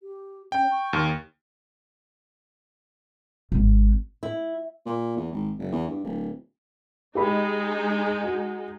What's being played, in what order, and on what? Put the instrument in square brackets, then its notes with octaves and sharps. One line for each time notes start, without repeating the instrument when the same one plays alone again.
[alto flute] G4
[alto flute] C#4 [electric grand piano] G5
[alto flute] C#6
[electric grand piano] D#2
[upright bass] G#1
[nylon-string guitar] E4
[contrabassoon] A#2
E2
G#1
F#1
E2
G2
D1
[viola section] G#3 D#4 [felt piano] G4 D#5 B5
[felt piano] F#4